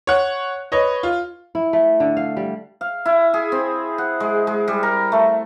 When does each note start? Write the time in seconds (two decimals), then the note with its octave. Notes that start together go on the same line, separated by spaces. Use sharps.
0.07 C#5 F#5
0.72 B4 C#5 D#5
1.03 F4
1.55 E4
1.73 A3
2.00 D3
2.17 F5
2.37 G3
2.81 F5
3.05 E4
3.34 G#4
3.52 C4
3.98 F#5
4.20 G#3
4.47 G#3
4.68 G3
4.83 A#4
5.12 A3